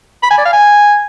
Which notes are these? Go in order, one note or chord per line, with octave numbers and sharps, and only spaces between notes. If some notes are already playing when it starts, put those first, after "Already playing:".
B5
G#5
D5
F5
G#5